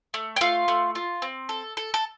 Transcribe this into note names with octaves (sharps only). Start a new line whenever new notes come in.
A3
G5
A3 F4 F5
A3
F4
C4
A4
A4
A4